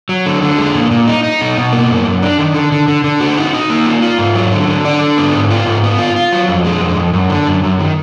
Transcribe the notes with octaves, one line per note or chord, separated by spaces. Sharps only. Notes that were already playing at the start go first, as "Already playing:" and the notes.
F#3
D3
D3
G#3
A#2
A#2
D#4
D#4
B2
B2
A#3
F#2
F#2
D4
D#3
D3
D3
D3
D3
F#4
D#4
D#4
A#3
F4
F4
G#2
F#3
D3
D3
D4
D3
B3
G#2
F4
G#2
B3
F4
F4
F#3
F2
G#3
F2
F2
F#2
D3
F#2
F#2
D#3